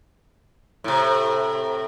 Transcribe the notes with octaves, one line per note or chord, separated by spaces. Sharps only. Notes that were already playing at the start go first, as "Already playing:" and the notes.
A2 C3